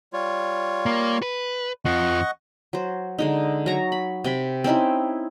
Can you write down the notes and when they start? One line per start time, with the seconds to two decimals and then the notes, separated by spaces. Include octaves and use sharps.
0.13 G3 F4 C#5
0.86 A#3
1.22 B4
1.85 F2 F3 D#5 F#5 C#6
2.73 F#3 C5
3.19 D3 G#3 D#4
3.66 F#3 A#5 C#6
3.92 B5
4.24 C3 G5 B5
4.64 C4 C#4 D#4 E4